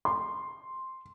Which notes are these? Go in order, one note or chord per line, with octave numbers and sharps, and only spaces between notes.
C6